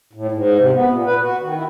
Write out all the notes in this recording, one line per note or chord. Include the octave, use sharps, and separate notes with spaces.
A2
G#2
C3
B3
A#2
B4
F#4
D#3
E4